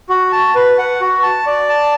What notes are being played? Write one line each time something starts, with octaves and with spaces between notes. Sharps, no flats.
F#4
A5
B4
F#5
F#4
A5
D5
A5